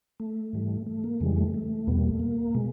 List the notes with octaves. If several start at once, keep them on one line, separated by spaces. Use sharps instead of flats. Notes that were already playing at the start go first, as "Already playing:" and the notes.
A3
G#2 E3 G3
A3
A#3
F2 C#3 E3 G3 G#3
A3
A3
E2 B2 G3 B3
A#3
A3
A#3
B2 G#3